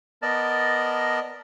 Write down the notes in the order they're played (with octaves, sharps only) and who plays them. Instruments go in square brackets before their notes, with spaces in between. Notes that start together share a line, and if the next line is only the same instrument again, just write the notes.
[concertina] B3 A#4 D5 D#5 A5